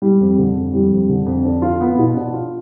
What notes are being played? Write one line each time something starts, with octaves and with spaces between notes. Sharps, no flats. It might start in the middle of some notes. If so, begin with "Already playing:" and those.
G3
F2
D3
F2
G3
F2
D3
F2
D4
F4
B3
B2
D4
F4